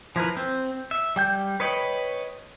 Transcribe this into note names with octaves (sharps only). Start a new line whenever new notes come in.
F3 E4 A#4 B4
C4
E5
G3 G5 G6
B4 C#5 D#5 G5 B5